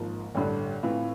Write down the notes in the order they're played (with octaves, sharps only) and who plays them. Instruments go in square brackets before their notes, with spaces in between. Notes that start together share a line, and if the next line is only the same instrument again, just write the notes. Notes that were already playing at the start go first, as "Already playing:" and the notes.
Already playing: [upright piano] G#1 G#2 F3 A#3
A1 G2 D3
A2 E3 A3 C4 F4